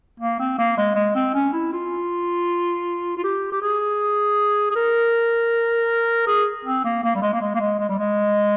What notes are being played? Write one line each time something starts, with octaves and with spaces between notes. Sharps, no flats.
A#3
C4
A#3
G#3
G#3
C4
C#4
E4
F4
F4
G4
G4
G#4
G#4
A#4
G#4
C4
A#3
A#3
G3
G#3
A#3
G#3
A#3
G#3
G#3
G3
G#3